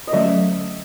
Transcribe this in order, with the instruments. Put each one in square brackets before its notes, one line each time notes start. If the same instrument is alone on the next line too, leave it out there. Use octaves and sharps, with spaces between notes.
[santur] D#5
[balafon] D3 F#3 A3 C#4 [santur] E5